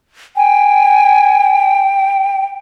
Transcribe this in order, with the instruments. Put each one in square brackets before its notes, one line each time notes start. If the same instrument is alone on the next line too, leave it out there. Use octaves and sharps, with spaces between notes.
[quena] G5 [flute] G#5